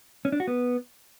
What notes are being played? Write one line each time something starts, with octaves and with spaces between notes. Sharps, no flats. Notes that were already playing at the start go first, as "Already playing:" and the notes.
C#4
D4
F#4
B3